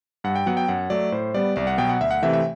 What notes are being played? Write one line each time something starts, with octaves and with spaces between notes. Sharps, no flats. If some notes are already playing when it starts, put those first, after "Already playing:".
G2 F#5
G5
F#3 B3 F#5
G5
F#2 F#5
F#3 A3 D5
A2 C5
G3 B3 D5
C2 D5
F#5
B2 F#3 B3 G5
F#5
D2 E5
F#5
C3 E3 A3 E5
E5